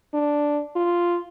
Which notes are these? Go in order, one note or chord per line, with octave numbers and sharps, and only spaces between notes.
D4
F4